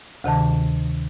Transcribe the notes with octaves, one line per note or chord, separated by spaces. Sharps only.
D2 C3 D#3 A5